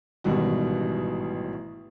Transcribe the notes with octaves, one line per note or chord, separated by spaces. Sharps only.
A1 G#2 B2 D#3 G3 F#4